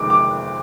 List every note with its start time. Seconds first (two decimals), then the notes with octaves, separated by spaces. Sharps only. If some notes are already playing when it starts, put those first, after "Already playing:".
Already playing: G1 F2 C3 D#3 G#3 D6
0.10 D6